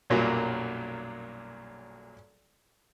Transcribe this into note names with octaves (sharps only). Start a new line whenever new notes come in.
B1 F#2 A#2 F#3 G3 A#3